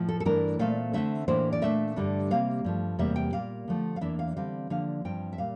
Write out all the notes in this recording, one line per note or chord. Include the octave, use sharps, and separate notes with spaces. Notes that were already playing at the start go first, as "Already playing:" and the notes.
Already playing: A2 F3
A4
A4
G2 E3 A3 D4 A#4
A#2 A3 C4 F5
D3 A3 C4 E5
A2 E3 A#3 D4 C5
D5
A#2 A3 D4 E5
G2 D3 G3 D4
C3 G3 A#3 F5
G2 F3 A3
E2 C3 G3 A#3 E5
G5
A#2 G3 A#3 F5
D3 F3 A3
F5
E2 E3 A#3 D4 E5
F5
D3 G3 C4 F5
D3 F3 A#3 D4 F5
G2 F3 C4 G5
E5
A#2 G3 F5